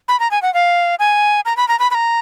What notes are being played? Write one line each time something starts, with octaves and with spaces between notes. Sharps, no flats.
B5
A#5
G#5
F#5
F5
G#5
A#5
B5
A#5
B5
B5
A#5